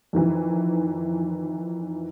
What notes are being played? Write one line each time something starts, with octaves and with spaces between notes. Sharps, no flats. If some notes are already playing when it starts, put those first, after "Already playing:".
F2 D#3 E3